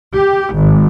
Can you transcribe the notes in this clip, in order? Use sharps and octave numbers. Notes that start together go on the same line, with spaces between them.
G4
G#1